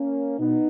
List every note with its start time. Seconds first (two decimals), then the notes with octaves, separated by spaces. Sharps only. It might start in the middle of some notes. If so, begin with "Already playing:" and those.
Already playing: A#3 C#4
0.38 B2 B3 D#4